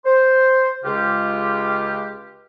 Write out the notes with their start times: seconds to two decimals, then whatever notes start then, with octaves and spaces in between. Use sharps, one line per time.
0.05 C5
0.84 C#2 C#3 G#3 F4 G4